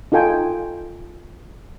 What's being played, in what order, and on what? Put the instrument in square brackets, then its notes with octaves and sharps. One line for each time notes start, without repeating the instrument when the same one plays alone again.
[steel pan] D#4 F4 A4 G5 G#5